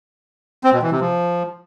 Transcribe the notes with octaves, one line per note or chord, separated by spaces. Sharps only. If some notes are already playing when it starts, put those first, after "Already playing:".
C4
B2
E3
C3
F3